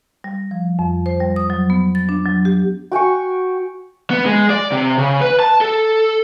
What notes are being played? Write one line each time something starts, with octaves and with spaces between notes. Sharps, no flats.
G3
F3
F2
C5
G3
D#6
F#3
B3
A6
D4
F#3
G4
F#4 G5 G#5 C#6
B3
G#3
D5
C3
C#3
B4
A5
A4